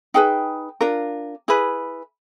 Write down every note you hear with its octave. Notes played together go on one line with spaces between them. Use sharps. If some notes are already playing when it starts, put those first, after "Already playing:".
D#4 G#4 B4 G5
D4 F4 A#4
E4 G#4 B4